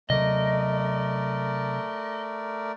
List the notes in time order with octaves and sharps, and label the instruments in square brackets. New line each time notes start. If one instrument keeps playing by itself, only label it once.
[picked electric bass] C3 F#3 [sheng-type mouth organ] A3 A#4 D5 [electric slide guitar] D#5